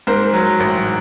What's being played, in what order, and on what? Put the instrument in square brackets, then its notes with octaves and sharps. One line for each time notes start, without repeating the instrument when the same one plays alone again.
[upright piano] G#2 A#4 C5
F#3
A1